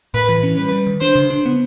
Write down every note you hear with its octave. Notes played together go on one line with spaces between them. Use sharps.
A2 B4
E3
C#4
G3 B4
G3
D#3
D4 C5
C#3
D4
B3